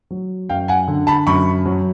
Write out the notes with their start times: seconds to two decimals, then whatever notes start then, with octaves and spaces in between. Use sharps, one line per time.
0.11 F#3
0.49 F#2 F5 G5
0.68 F#5 G#5
0.88 D3
1.07 A5 B5
1.27 F#2 B5 C#6
1.66 F#3